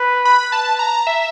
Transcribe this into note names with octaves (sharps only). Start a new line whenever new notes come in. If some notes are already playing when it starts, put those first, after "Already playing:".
Already playing: B4
B5
A5
A#5
E5